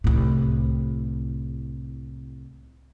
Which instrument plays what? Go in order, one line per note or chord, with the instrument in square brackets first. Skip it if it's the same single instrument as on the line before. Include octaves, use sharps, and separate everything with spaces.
[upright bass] C2 A2